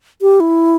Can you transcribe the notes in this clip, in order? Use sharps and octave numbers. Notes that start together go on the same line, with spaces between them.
G4
E4